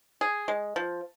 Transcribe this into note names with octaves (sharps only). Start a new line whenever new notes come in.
G#4
G#3
F3